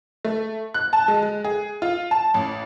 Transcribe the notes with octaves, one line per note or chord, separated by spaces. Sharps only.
A3
F#6
A5
G#3
G#3
G#4
F4
A5
A1